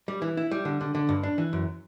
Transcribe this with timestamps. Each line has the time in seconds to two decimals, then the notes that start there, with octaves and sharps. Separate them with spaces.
0.08 G3
0.22 E3
0.37 E4
0.51 G3
0.65 D3
0.81 D3
0.95 D3
1.09 G2
1.23 D4
1.38 E3
1.53 F#2